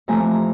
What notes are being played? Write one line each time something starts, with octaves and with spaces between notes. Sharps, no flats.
F2 C3 E3 A3 G#5 A#5
A#5